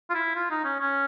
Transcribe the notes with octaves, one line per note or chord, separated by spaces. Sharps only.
F4
E4
F4
D#4
C#4
C#4